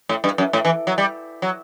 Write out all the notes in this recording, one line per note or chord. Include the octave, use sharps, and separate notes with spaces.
A2
G2
F#2
A2
E3
F#3
G3
F#3